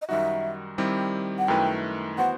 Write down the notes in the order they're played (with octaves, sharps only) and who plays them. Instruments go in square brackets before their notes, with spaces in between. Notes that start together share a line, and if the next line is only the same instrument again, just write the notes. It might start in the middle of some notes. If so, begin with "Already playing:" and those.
[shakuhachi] D#5
[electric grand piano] F#2 D#3 G3 D#4 F#4 [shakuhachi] E5
[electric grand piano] D#3 G3 C4 E4 G4
[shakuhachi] F#5
[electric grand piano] F#2 D#3 A3 E4 B4 [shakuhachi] G5
[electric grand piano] E3 B3 F#4 C5 [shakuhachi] F#5